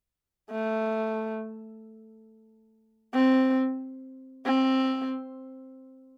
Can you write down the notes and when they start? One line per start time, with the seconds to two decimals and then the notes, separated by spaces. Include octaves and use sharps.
0.51 A3
3.15 C4
4.46 C4